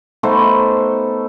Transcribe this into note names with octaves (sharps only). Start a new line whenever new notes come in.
A3 B3 D#4 C5